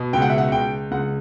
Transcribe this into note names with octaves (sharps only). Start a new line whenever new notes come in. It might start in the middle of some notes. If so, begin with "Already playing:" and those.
Already playing: B2
C#2 G5
F#5
E5
F#5
C#2 G5
C#2 F#5